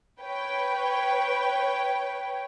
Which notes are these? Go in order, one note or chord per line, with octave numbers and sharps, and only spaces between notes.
B4 C#5 G5